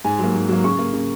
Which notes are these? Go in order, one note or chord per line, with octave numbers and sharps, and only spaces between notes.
G#2 G#5
F#3 A#3
G#2
F#3 A#3
C#3 C#6
A#3
C#3